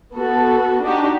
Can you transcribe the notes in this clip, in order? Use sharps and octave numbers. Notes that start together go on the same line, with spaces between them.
B3 F#4 A4
D4 D#4 F#4 G4